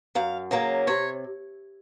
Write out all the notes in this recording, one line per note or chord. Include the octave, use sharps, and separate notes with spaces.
F#2 F5
C#3 F#3 A#3 C#4
C3 C#5